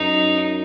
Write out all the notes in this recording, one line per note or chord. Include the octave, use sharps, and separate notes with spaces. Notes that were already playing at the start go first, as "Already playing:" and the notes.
Already playing: F#2 D#4